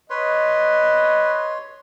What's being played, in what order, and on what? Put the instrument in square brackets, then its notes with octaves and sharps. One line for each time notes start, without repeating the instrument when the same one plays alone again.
[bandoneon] B4 [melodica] C#5 C6 [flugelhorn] D#5